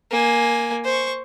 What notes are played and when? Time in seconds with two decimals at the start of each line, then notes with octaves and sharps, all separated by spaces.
0.10 A#3 G#5
0.85 C5 C#6